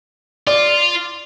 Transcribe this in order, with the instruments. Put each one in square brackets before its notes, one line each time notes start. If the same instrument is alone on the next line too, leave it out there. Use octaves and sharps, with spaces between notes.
[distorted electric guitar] F4 [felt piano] D5